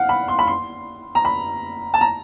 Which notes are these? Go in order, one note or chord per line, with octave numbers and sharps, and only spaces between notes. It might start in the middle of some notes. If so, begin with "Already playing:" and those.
Already playing: F5 F#5
B5
C6
B5
C6
A#5
B5
A5
A#5